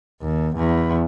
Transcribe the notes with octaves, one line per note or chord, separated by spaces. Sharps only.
D#2
E2